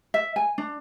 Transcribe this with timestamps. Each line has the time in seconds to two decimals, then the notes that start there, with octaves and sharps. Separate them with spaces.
0.14 E5
0.36 G#5
0.58 D4